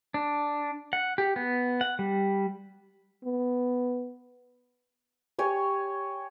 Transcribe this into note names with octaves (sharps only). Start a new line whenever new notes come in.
D4
F#5
G4
B3
F#5
G3
B3
G4 C#5 G#5